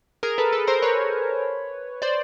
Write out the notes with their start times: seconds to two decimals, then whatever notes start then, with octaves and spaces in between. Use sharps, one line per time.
0.23 G#4 A#4
0.38 A4 B4
0.52 A4 B4
0.67 A#4 C5
0.82 B4 C#5
2.02 C5 D5